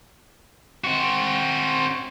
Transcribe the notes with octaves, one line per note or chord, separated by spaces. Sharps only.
C4 F#4